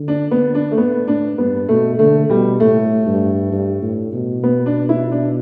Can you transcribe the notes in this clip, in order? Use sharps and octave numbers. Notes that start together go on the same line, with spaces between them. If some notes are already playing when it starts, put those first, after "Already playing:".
Already playing: D3
D4
D3 B3
D4
A3
A2 B3
A2 D4
G2 B3
B2 A3
D3 A3
B2 G3
A2 A3
G2
G2
A2
B2
B3
D4
E4
D4